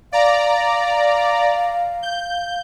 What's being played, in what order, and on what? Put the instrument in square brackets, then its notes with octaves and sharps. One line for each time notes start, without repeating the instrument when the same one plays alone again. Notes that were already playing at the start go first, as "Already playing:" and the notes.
[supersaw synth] D5 A#5 [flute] F5
[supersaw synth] G6